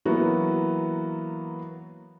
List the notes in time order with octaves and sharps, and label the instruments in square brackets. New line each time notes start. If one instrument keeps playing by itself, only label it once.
[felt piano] E3 F#3 A#3 B3 F#4